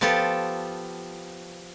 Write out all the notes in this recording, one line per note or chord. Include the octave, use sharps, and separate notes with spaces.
F3 B3 F4 G4 A4